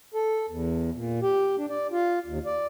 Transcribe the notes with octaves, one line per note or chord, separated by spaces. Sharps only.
A4
E2
A#2
G4
D4
D5
F4
D#2
D5